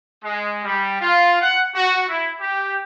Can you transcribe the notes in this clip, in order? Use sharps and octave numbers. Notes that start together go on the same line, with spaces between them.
G#3
G3
F4
F#5
F#4
E4
G4